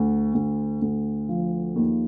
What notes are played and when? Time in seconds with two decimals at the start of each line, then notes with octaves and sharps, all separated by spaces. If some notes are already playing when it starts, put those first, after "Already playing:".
Already playing: D2
0.34 D2
0.82 D2
1.29 F3
1.76 D#2